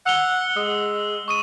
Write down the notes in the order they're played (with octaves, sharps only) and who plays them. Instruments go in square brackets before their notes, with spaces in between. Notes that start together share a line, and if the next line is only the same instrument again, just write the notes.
[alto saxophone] F#5 [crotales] E6 F7 G7
[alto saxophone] G#3 [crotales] D#6
[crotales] C#6 D#6 D#7